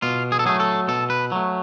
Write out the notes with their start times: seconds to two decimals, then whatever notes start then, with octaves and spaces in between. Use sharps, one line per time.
0.02 B2 F4
0.32 G#4
0.39 A4
0.46 F#3 A3 G#4
0.60 A4
0.88 B2 A4
1.10 B4
1.32 F#3 A3